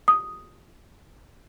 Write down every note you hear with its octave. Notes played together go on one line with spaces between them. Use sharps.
D#6